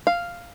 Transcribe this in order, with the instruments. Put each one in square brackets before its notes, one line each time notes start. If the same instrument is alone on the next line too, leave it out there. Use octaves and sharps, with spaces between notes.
[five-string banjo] F5